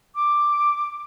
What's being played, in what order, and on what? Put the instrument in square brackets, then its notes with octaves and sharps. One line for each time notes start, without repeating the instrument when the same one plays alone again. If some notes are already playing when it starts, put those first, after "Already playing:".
[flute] D6